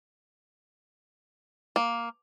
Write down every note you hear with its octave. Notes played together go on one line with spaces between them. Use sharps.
A#3